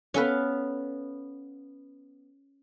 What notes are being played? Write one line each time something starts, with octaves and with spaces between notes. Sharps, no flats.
B3 C#4 A4 B4 F5